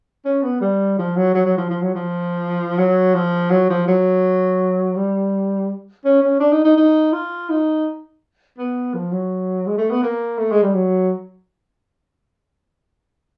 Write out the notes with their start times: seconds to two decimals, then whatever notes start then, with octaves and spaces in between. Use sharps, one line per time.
0.25 C#4
0.43 B3
0.61 G3
0.98 F3
1.16 F#3
1.35 F#3
1.45 F#3
1.57 F3
1.70 F3
1.82 F#3
1.95 F3
2.78 F#3
3.14 F3
3.50 F#3
3.70 F3
3.88 F#3
4.96 G3
6.05 C#4
6.22 C#4
6.40 D4
6.52 D#4
6.65 D#4
6.77 D#4
7.13 F4
7.50 D#4
8.58 B3
8.94 F3
9.12 F#3
9.67 G#3
9.78 A3
9.91 B3
10.03 A#3
10.38 A3
10.51 G#3
10.63 G3
10.74 F#3